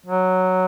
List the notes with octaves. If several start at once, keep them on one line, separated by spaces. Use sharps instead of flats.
F#3